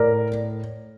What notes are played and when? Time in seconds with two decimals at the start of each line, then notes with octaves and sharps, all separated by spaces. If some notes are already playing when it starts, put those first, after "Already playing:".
Already playing: A2 A#4 D5